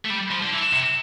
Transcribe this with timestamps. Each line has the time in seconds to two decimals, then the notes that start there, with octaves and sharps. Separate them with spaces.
0.05 A3
0.10 G3
0.31 F3
0.42 D3
0.53 E3
0.73 C3